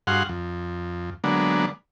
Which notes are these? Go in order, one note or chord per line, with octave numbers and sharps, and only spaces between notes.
G2 F#4 G#4 F5 F#5 C6
F2
D3 F#3 G#3 A#3 B3 D4